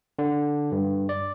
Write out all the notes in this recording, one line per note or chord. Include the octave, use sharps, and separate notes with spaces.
D3
G2
D5